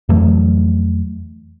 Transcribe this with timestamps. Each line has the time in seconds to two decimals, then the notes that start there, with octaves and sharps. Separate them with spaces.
0.09 F2 E3 F#3 A3